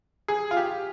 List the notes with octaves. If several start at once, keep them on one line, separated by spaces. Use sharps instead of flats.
G#4
F4
G4